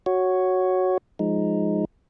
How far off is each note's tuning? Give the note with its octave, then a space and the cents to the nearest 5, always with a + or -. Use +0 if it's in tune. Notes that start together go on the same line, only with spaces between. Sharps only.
F#4 +0 C#5 +0
F3 +0 G#3 +0 D#4 +0